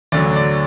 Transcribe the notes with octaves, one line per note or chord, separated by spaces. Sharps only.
D2 D3 F#3 D5
D5